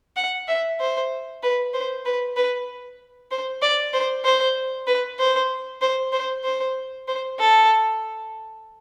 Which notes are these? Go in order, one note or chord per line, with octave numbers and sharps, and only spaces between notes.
F#5
E5
C5
B4
C5
B4
B4
C5
D5
C5
C5
B4
C5
C5
C5
C5
C5
A4